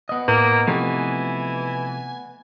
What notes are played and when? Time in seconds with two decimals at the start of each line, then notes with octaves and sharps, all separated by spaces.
0.09 B3 D#5
0.28 A2 A#3 B4
0.67 C3 E3 F3 A3 G#5